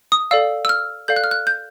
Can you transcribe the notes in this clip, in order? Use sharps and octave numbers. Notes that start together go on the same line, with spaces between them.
D#6
A4 D5 F5 E6
E6
F6
A4 D5 F5 G6
F#6
F6
F#6
G6